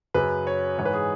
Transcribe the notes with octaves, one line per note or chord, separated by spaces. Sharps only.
F#2 C#3 F#3 B4
C#5
G#2 E3 C#5
B4
G#4